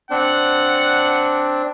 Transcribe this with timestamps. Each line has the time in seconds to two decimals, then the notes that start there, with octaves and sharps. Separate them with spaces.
0.10 C4 D4 F#5